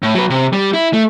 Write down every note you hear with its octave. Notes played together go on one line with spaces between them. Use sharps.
A2
F#3 B4
C3
G3
E4
A3